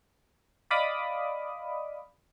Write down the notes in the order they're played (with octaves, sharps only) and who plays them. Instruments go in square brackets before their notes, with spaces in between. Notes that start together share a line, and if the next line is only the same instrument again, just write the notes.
[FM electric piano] D5 D#5 F5 B5 D6 D#6